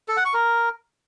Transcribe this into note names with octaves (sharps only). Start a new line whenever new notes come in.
A4
F#5
C#6
A#4